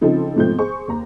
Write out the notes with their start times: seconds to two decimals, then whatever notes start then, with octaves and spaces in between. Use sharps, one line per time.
0.01 C#3 F3 C4 D#4 A4
0.36 G#2 B2 F3 A3 C4 G6
0.59 G#4 C5 C#6
0.88 D#2 A#5